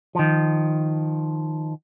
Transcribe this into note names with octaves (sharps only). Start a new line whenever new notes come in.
D#3 F3